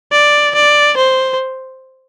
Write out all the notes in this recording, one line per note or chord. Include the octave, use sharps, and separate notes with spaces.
D5
D5
C5